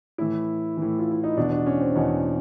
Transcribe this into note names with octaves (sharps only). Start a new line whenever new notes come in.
A2 E3 E4
A2 E3
F4
E4
D#4
E2 B2 D4
D4
C#4
C4
E2 B2 C#4